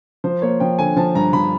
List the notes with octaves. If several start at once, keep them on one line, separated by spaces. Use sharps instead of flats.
F3 C5
A#3 C#5
F3 G5
D3 G#5
F3 A5
G2 A#5
F3 B5